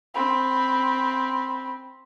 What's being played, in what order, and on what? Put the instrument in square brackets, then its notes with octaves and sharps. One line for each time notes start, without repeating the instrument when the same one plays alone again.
[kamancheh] C4 B5